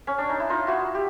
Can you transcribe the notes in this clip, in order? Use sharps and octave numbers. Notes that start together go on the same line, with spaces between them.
C#4
D4
D#4
E4
D#4 F4
E4 F#4
G4